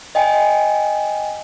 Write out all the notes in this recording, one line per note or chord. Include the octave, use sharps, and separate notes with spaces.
D#5 G5 G#5